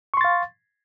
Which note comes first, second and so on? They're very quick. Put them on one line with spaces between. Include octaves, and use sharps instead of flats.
C#6 C6 A6 F5